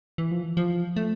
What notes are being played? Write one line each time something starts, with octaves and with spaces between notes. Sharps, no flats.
E3
F3
E3
F3
A3